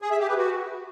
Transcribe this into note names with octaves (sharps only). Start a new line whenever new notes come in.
G#4
E5
G4
B4
F#4